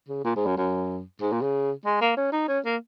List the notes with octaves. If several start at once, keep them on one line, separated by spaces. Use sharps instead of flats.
C#3
A#2
G#2
F#2
F#2
G#2
A#2
C#3
G#3
A#3
C#4
D#4
C#4
A#3